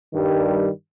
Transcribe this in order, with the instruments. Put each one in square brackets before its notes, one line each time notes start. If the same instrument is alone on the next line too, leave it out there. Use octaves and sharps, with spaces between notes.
[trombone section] G2 D#3 G3